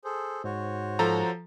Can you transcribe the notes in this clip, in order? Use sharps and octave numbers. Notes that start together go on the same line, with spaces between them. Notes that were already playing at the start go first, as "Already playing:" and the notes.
G#4 A4 C5
G#2 F#4 C5 C#5
F3 A4 A#5